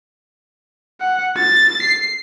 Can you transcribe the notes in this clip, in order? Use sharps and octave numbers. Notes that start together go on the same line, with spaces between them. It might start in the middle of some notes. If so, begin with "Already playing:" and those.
F#5
A6
C7